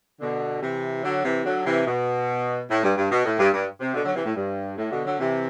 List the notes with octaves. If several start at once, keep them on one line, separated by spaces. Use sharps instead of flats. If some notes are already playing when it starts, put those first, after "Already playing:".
B2 D3
C3 E3
D3 F#3
C3 E3
D3 F#3
C3 E3
B2
A2
G2
G2
B2
A2
G2
G2
C3
B2 D3
D3 F#3
C3 E3
A2
G2
A2
B2 D3
D3 F#3
C3 E3